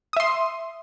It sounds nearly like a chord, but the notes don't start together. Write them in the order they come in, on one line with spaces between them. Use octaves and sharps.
D#6 E5 C6